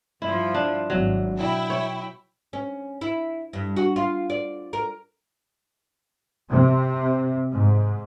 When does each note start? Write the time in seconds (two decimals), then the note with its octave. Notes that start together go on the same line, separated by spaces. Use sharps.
0.22 G2 F3 E4
0.54 D4
0.90 G#1 F#3
1.37 B2 E4 G5
1.70 C#5
2.53 C#4
3.01 E4
3.53 G2
3.76 F#4
3.96 F4
4.30 D5
4.73 A#4
6.49 C3
7.50 G#2